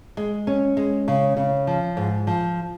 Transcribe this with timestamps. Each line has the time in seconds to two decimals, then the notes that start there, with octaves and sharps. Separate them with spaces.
0.17 G#3
0.47 C#4
0.77 G#3
1.08 C#3
1.37 C#3
1.67 F3
1.97 G#2
2.27 F3